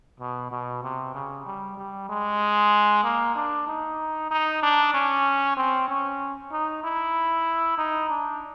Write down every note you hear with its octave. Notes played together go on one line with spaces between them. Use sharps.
B2
B2
C3
C#3
G3
G3
G#3
A#3
D4
D#4
D#4
D4
C#4
C4
C#4
D#4
E4
D#4
D4